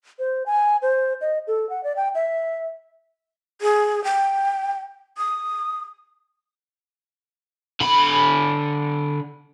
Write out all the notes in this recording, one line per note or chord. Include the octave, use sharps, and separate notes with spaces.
C5
G#5
C5
D#5
A4
F#5
D5
G5
E5
G#4
G5
D#6
D3 B5